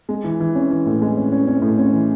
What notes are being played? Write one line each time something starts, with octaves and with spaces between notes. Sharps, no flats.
G#3
E3
E3
C#4
E3
A2
G#3
C#4
C#4
C#4
A2
C#4
E3